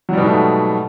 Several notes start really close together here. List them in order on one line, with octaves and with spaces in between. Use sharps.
F#3 G3 B2 G#2 A3